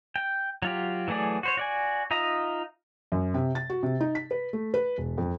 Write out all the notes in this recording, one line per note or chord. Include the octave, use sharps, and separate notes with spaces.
G5
F#3 F4 G4
E3 F#3 A3 G#4 D5
F#4 C5 C#5
F#4 D5 G#5
D#4 F4 E5 A#5 D#6
F#2
C3
A6
F#4
C3
D#4
B6
B4
A3
B4
E1
F2